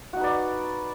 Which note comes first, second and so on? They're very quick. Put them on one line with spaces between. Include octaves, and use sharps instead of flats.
F#4 D#4 B4 D5